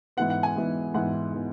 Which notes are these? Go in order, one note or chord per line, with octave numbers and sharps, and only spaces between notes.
G#2 E3 B3 F#5
F#5
G#5
G#2 E3 B3
G#2 E3 B3 F#5
E3 B3